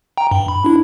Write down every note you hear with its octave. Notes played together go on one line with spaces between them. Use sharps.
G5 A#5
G2
B5
D4 E4